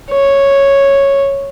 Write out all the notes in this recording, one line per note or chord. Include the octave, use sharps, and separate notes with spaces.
C#5